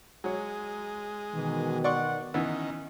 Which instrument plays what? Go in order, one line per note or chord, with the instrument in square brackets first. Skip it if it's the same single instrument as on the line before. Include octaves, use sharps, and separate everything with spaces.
[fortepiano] F#3 C#5 [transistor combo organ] G#3
[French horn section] B2 D#3 [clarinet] E3
[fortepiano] D5 C6 C#6 [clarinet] F#5
[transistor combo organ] D#3 [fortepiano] E3 B3 [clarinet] C#4